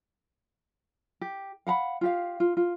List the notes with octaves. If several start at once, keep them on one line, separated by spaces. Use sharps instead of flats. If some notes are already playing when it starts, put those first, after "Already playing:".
G4
F5 F#5 A#5 B5
F4 G4 F5
F4
F4